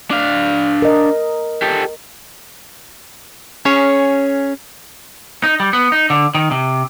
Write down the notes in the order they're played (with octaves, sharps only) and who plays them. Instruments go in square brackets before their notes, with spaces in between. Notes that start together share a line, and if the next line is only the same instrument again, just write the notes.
[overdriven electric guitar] D4 F5
[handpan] A#4 D#5
[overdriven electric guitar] G4 A4
[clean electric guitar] C#4 G#4 C#5
[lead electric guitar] D#4
G3
B3
D#4
D3
D#3
C3